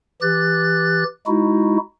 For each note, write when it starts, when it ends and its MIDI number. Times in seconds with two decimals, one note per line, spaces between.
0.22 1.04 52
0.22 1.04 67
0.22 1.04 90
0.22 1.04 93
1.27 1.77 56
1.27 1.77 63
1.27 1.77 64
1.27 1.77 66